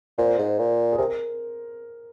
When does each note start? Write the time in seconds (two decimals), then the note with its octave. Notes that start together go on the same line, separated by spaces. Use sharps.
0.18 A#2 C5
0.39 G#2
0.59 A#2
0.92 G#4
0.98 C3 A#4